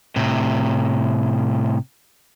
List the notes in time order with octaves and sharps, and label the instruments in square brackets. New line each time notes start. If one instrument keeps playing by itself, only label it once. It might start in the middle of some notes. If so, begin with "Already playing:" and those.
[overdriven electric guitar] A2 C3